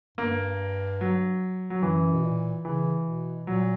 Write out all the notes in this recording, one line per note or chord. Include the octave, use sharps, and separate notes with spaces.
G2 A#3
F#3
F#3
F#2 E3
B2
A#2
C#3 E3
B2
A#2 F#3